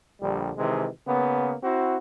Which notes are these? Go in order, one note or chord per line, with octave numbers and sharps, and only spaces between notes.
A#1 D3 G3
C3 D#3 E3 G#3
C#3 A#3 B3
C4 E4 F#4